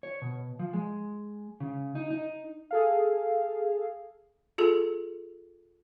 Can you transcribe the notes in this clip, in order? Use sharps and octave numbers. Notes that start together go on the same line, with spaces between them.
C#5
B2
F3
G#3
C#3
D#4
D#4
G#4 A4 F5
F4 G#4 A4